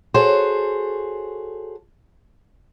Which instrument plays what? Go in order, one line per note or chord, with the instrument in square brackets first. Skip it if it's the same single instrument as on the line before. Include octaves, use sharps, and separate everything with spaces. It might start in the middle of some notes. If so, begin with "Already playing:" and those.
[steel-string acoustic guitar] F#4 G#4 A4 C5 C#5